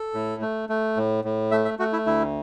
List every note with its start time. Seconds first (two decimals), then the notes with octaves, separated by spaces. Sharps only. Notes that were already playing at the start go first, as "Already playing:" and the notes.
Already playing: A4
0.14 A2
0.42 A3
0.69 A3
0.96 A2
1.24 A2
1.51 A3 E5
1.65 E5
1.79 A3 F#4
1.93 E4
2.06 D2 E4